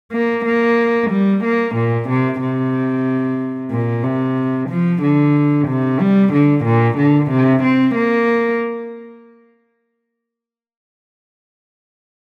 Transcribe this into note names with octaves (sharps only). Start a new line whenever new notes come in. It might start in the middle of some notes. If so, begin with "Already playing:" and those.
A#3
A#3
G3
A#3
A#2
C3
C3
A#2
C3
F3
D3
C3
G3
D3
A#2
D3
C3
C4
A#3